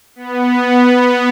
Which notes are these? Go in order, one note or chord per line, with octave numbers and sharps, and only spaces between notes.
B3